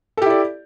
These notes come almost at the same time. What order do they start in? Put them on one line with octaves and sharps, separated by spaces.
A4 G4 E4 D5